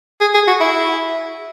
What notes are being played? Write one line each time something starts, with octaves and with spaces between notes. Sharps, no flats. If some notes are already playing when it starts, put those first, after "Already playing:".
G#4
G#4
F#4
E4